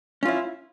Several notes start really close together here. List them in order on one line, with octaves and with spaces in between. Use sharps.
C#4 F4 E4